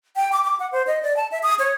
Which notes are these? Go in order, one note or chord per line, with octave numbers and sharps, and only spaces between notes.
G5
D6
D6
F#5
C5
D#5
D5
A5
E5
D#6
C#5